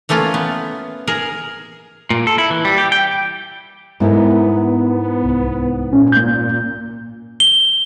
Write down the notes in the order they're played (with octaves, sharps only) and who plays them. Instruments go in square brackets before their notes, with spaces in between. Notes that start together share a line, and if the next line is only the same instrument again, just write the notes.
[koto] E3 A3 A#3 C#4 F4
B3
G#4 A#4
[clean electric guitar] A#2
A4
E4
E3
G3
G4
G5
[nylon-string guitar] G#2 E4 A#4 [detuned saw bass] B3
[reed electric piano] C2
[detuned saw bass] A#2 [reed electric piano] C#4
[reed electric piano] A#3 G6
[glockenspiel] G7